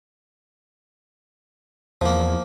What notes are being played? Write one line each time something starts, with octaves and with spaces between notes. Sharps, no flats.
E2 F3 A#3